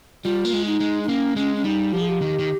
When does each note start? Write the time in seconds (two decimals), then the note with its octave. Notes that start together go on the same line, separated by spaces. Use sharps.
0.24 G3 F4
0.45 A#3
0.53 G#3
0.66 D#4
0.80 G#3
1.03 D#4
1.08 A#3 C#4
1.36 G#3 C#4
1.57 C#4
1.64 G3 D#4
1.93 F3 G4
2.01 G#4
2.09 G4
2.21 D#3
2.39 D#3